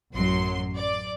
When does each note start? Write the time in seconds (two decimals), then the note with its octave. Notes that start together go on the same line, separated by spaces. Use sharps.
0.14 A1 F#2 F#3 C6
0.76 D5